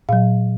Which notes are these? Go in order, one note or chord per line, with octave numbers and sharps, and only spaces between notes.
A#2 F#3 F5